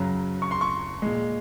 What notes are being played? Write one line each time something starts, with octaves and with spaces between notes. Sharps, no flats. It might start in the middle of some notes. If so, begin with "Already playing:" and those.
Already playing: F#2 C#3 F#3 A#5
C#6
C6
C#6
A#2 G#3